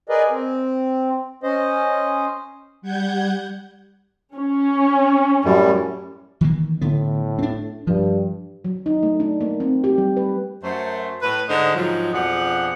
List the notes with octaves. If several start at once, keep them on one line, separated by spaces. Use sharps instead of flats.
G#4 A#4 B4 D5 D#5
C4
C#4 C5 D#5
G3 F#5 G6 G#6
C#4
F#2 A2 G3
D#3 E3 A#3
A2 D3 B3
C4 D4
G2 F3
F#3
D#4
A3
D4
A#3
C4
G4
G3
B4
F#2 A3 C5
A2 B4
G#2 D3 G#3 C5 D#5
G#2 F3 F#3
F2 B2 F3 D4 G#4 F#5